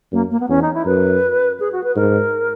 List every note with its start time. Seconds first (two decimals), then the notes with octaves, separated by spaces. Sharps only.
0.12 F#2 A#3
0.31 A#3
0.40 B3
0.49 E2 C#4
0.62 D#4
0.74 E4
0.86 F#2 B4
1.60 G#4
1.72 F#4
1.84 B4
1.96 G#2 A#4